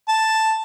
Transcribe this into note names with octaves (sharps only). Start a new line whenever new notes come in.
A5